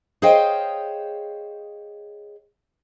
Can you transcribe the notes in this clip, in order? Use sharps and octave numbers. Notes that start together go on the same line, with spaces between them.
G#4 C5 C#5 D#5 F5 G5